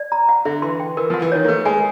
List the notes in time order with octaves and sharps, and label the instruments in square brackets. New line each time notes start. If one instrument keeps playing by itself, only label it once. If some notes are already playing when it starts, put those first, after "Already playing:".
Already playing: [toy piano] D5
A#5
F#5
[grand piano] D3 [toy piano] E5
[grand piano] E3 [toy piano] C6
[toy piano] G5
[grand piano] E3 [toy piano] A#4
[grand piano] F3 [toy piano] F#5
[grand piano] E3
[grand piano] D#3 [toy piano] C#5
[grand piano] A#3
[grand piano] A3 [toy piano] B4
[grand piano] G#3 [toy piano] G#5